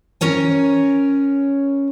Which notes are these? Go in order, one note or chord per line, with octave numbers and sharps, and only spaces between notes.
C#4 A#4 C#5 G#5